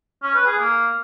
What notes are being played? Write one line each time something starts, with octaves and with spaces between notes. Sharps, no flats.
C#4
B4
G#4
A#3